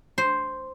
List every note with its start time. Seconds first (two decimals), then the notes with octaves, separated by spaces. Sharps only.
0.18 C5